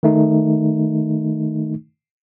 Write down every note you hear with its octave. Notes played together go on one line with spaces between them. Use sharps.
D#3 A3 D#4